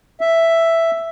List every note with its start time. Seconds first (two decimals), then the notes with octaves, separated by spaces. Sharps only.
0.21 E5